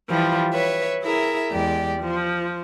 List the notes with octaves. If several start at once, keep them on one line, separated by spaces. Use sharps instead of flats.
E3 F3 G3 F4
B4 C#5 E5
E4 G#4 A#4 E5
E2 G#3 G4 D5
F3